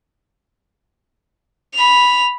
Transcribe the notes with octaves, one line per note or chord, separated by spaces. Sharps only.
B5 F7